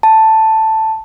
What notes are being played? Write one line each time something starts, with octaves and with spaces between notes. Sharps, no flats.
A5